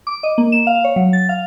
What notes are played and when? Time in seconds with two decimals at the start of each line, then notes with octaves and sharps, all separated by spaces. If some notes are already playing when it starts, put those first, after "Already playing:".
0.07 D6
0.23 D#5
0.38 A#3
0.52 E7
0.67 F5
0.84 C#5
0.96 F#3
1.13 A6
1.29 F5